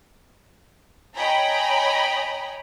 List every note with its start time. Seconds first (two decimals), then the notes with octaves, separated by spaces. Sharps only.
1.15 C#5 D#5 G5 G#5 A#5 B5